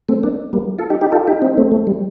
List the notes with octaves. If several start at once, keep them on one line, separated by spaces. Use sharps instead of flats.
A3 C4
A#3 D4
G3 A#3
F4 A4
D#4 G4
D#4 G4
F4 A4
D#4 G4
C4 D#4
A3 C4
A3
G3